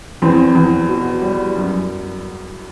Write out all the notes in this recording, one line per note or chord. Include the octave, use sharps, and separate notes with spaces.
E2 C4
E2
B2
G3
F#2